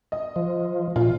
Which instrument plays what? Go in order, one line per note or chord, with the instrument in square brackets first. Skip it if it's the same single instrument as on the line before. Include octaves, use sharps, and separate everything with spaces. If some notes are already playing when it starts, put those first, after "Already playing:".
[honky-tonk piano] D#5
[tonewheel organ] F3
[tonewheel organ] A#2 [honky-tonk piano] F4